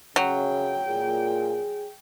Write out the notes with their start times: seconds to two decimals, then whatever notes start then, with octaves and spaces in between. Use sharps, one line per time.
0.16 F#2 C#3 F#3 G5
0.88 A#2 G#4